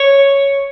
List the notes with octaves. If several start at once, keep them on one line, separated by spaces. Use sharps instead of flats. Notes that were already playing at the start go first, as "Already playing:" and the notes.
Already playing: C#5